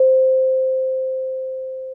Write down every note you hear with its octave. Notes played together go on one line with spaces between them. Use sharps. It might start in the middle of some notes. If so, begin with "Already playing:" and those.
Already playing: C5